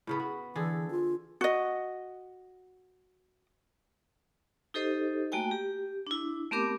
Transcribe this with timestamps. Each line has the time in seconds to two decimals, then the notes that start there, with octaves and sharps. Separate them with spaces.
0.07 A2 C#3 B3
0.20 F#4
0.56 D3 E3 G#4 A4
0.91 F4
1.41 F#4 D#5
4.74 D#4 G4 A4 C5 D#5
5.32 A3 A#3 F#4 G5 G#5
5.51 G4
6.07 D4 E4
6.52 A3 B3 C4 G4 A#4 D6